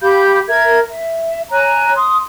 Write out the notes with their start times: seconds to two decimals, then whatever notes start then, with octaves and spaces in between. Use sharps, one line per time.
0.01 G4 F5 B5 G6
0.47 A#4 E5 G#6
0.88 E5
1.51 C#5 G#5 A#5 F#6
1.95 C6 D#6